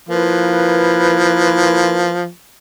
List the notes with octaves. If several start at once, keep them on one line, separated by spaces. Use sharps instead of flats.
F3 A#3 E4 B4